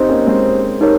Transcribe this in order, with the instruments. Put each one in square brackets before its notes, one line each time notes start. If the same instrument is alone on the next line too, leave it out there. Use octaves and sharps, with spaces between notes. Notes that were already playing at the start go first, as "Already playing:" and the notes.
Already playing: [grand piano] C4 D#4 [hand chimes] G4 C5 D#5
[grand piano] A#3 C#4
G#3 C4
[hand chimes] D#4 G4 A#4 C#5